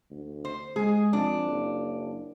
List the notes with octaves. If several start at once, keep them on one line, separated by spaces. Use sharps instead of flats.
D2
C5
G#3 G#4
F2 D4
F#1